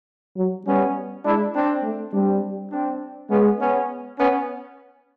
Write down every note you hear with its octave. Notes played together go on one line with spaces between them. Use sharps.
F#3
G3 B3 C#4
G#3 D4 E4
C4 D4
A3
G3 C4 D4
C4 D4
G#3 B3 C#4
B3 C#4
B3 C#4